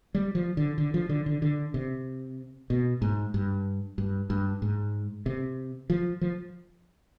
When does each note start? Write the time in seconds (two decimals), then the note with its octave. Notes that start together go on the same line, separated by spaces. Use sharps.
0.15 G3
0.35 F3
0.57 D3
0.78 D3
0.94 F3
1.09 D3
1.26 D3
1.42 D3
1.74 C3
2.70 B2
3.02 G#2
3.34 G2
3.98 G2
4.30 G2
4.62 G#2
5.26 C3
5.90 F3
6.21 F3